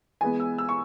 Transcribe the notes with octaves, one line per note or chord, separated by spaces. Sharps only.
E3 G#3 B3 G#5
E6
E6
C#6